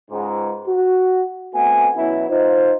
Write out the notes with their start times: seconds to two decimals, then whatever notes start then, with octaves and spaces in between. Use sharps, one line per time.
0.11 C#2 G#2
0.67 F#4
1.54 A3 B3 C4 F#4 F#5 G#5
1.96 B2 F#3 B3 C#4 E4
2.29 D#4 F4 C5